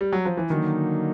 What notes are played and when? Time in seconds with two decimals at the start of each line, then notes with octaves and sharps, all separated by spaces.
0.01 G3
0.13 F#3
0.25 F3
0.37 E3
0.50 D3 D#3 F#3 A#3 D#4